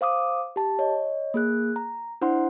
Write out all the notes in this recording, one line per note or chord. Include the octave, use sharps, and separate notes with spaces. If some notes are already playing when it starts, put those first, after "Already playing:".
C5 F5 D6 D#6
G4 A5
C#5 D#5
A#3 G#4 F#6
A#5
D4 E4 C5 F#5 C6